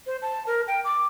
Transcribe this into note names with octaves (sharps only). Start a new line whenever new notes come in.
C5
A5
A#4
G5
D6